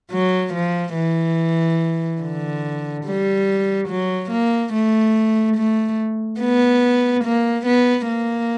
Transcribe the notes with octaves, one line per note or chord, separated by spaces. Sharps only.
F#3
F3
E3
D3
G3
F#3
A#3
A3
A3
B3
A#3
B3
A#3